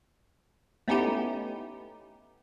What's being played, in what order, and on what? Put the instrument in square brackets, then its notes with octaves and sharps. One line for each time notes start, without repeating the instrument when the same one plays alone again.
[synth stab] A3 B3 C#4 D#4 E4 G4